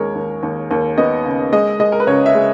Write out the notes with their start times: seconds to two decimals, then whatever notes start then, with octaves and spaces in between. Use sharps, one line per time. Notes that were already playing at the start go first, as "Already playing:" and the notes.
Already playing: D#2 G#3 A#4 C#5
0.15 D#2
0.43 D#2
0.71 D#2
0.98 B3 D#5
1.25 C#3
1.52 G#3 D#5
1.80 G#3 D#5
1.92 A#4
2.00 B4
2.07 C#2 C#5
2.26 E5
2.35 G#3